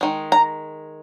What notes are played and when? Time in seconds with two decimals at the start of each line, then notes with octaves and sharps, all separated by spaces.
0.01 D#3 G#3
0.32 A#5